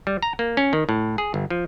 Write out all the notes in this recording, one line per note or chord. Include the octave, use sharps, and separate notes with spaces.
G3
A#5
A#3
C#4
D#3
A2
G#4
G1
F3